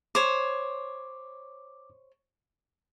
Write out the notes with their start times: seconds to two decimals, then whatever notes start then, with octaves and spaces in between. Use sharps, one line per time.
0.15 C5 C#5 D6